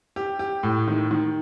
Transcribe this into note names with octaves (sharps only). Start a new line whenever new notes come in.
G4
G4
A2
D#3
D#3